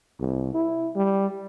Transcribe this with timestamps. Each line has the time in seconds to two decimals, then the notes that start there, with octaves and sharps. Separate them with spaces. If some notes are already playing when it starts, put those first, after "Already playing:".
0.20 C2
0.54 E4
0.95 G3